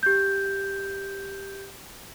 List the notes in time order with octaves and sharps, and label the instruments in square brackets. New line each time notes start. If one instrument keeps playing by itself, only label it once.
[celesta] G4 G6